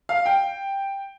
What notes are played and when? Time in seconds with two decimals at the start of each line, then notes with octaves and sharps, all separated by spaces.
0.09 F5
0.26 G5